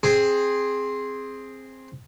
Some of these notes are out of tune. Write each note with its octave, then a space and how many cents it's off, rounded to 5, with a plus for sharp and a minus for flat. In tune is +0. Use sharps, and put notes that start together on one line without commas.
C4 +10 G#4 +0